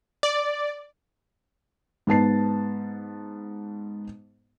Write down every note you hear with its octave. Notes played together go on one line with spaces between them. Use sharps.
D5
G#2 B3 A5 C7